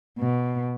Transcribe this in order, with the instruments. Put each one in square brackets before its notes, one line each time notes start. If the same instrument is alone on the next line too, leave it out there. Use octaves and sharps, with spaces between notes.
[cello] B2